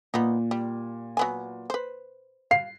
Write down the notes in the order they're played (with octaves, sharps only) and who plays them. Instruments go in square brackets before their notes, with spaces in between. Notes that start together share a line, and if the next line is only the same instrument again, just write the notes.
[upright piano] A#2 [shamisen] B3 D#4
[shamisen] G3
F#3 B3 G#5
B4 C5
[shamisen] F5 [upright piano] C7